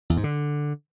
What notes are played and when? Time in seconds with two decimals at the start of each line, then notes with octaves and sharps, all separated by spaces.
0.10 E2
0.17 G#2
0.24 D3